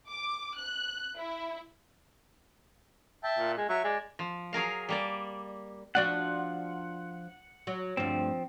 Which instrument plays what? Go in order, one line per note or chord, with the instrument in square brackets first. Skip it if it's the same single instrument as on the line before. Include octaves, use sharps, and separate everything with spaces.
[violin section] D6
F#6
E4
[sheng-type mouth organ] E5 G5 A5
[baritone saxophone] A#2
G#3
[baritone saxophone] F#3 [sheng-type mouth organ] E5 C#6
[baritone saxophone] G#3 [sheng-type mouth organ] D5
[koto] F3
F#3 G#4 A#4 F5
G3 A#3 D5
[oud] F3 D4 F#4 [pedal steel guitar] F#5
[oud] F#3
[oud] D2 G2 [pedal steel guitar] F3 C4